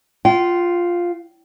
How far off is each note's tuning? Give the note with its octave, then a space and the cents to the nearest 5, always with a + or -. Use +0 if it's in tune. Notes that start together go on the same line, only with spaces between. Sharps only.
F4 +0 G5 -40